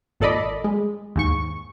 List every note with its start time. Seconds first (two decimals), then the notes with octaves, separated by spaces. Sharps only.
0.20 G#1 A#2 A4 D5 D#5 B5
0.64 G#3
1.16 D#2 G#2 C#6